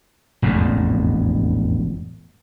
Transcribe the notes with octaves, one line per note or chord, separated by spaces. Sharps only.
E1 A1 F2 G#2